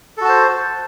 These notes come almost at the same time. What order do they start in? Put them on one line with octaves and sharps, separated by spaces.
A4 F#4 A5 C5